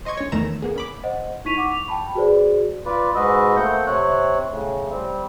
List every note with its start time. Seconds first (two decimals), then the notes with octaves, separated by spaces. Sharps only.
0.05 C5 D#5 C6 C#6 G#6
0.17 C#4 C#5
0.32 E2 D#3 A3 A#5 E7
0.62 A#3 B3 G#4
0.76 C#4 B5 D6
1.03 C5 D#5 F#5
1.45 D#4 E4 C#6 B6 D#7 F7
1.57 F#5 C#6 D6
1.72 F7
1.88 G5 A5 B5
2.15 F#4 G#4 B4 C5 D5
2.86 F4 B4 D5
3.15 G#2 G#3 F#4 B4 D#5 E6
3.56 A3 A#3 C4 F#5 G6
3.87 C3 C4 C#5 F#6
4.50 A2 C#3
4.90 G3 C4